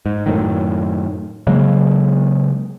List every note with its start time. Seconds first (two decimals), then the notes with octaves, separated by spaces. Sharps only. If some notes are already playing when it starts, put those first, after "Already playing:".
0.06 G#2
0.26 F#2 A2 D#3
1.47 C#3 F#3 G#3 A#3